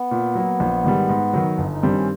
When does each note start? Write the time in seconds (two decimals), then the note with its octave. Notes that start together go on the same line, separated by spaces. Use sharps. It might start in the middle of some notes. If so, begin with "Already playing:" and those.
Already playing: B3
0.11 A#2
0.35 F#3 A#3
0.60 A#1
0.84 G#2 D#3 G3
1.09 G#2
1.33 D#3 F#3
1.58 G1 D#4
1.71 D#4
1.83 G2 D#3 G3 C4 D4
1.95 C#4